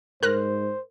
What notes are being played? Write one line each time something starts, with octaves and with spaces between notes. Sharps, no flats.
G#2 A#4 C5 F6 F#6 A#6